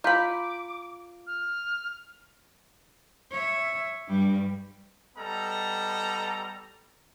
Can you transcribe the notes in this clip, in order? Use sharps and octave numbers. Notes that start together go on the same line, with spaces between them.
F4 A#5 B5 D6 G6 B6
F6
C#5 E5
G2 G3
G3 B3 A4 D#5 A#5